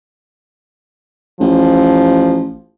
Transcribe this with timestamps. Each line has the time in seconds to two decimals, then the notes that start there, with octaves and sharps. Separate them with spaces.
1.40 A1 F3